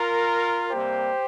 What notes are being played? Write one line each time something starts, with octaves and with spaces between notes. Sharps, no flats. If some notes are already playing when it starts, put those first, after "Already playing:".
Already playing: F4 A#4
C3 G3 A#3 G4 C5